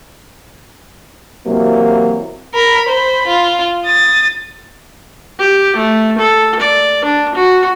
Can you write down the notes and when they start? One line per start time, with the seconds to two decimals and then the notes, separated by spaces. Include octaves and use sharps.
1.46 C3 E3 F#3 A#3
2.55 A#4 B5
2.89 C5 B5
3.27 F4
3.85 D#6 A6
5.39 G4
5.76 A3
6.18 A4
6.60 D5
7.05 D4
7.35 F#4